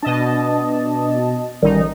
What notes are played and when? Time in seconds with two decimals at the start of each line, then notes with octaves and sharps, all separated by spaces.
0.03 B2 D4 D#5 A5
1.63 A1 D#3 G3 D#4